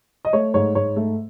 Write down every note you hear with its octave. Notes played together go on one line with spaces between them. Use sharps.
D#5
A3 C#5
G#2 C#5
G#2 C#5
A3